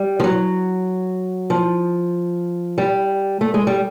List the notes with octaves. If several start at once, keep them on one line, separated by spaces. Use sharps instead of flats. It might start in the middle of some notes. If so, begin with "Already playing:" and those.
Already playing: G3
F3
F#3
F3
G3
A3
G#3
G3